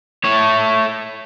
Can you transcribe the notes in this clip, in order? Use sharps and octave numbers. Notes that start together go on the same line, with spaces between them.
A3 C#5